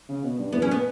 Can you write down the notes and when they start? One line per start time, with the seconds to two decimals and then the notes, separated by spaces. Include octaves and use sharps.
0.09 C#3
0.23 B2
0.38 G2
0.52 E2 B3
0.62 F#2 C#4
0.71 B3